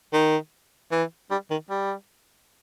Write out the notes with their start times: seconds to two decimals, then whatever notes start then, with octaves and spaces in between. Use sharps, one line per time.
0.13 D#3
0.91 E3
1.31 G3
1.51 D#3
1.70 G3